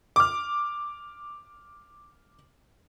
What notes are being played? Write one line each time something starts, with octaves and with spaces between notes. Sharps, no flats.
D6 F6